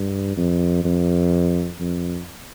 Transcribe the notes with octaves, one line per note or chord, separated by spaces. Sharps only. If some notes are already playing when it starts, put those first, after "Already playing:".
Already playing: G2
F2
F2
F2